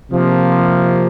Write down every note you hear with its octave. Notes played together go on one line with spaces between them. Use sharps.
C3 F3 A#3